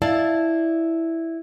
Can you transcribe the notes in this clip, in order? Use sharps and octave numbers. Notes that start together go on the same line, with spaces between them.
E4 D5 F5 A5